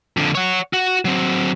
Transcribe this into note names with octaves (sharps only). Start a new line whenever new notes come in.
F2 D3
C#5 F#5
F#4
F#3 C4